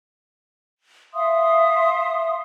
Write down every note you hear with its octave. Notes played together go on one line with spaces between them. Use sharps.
E5 F5 C6 D#6